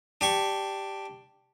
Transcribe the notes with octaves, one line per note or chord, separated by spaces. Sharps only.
D4 G4 C#6